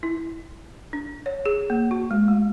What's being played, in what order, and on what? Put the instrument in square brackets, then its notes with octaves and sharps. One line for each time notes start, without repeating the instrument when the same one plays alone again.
[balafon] E4
D4
C#5
G#4
A#3
F#4
G#3
A3